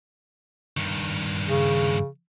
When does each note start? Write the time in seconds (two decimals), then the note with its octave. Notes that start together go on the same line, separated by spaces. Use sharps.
0.77 G2 D#3
1.49 C#3